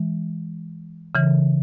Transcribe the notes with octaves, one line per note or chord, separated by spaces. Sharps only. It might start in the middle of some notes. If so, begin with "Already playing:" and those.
Already playing: E3 G#3
C#3 E3